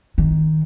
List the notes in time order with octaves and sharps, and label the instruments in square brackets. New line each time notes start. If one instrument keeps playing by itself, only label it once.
[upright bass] D#3